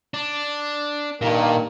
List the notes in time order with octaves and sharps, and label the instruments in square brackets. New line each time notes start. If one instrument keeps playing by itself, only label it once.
[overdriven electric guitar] D4
[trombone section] G2 D#3 A#3 [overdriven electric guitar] A#2